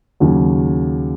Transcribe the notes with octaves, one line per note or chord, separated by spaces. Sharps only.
D#2 C#3 F#3